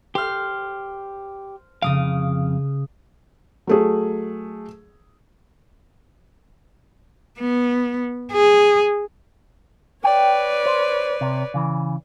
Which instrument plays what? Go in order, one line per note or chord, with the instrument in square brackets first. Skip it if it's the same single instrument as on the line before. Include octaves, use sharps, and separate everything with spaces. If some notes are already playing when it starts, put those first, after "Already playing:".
[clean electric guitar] G4 [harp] C5 F6
[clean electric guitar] F2 E3 F5 [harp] C#3 D#6 D7
[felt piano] F#3 A3 G#4
[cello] B3
G#4
[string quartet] B4 C#5 D5 [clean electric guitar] G5
[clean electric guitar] C5
C3
C#3 E3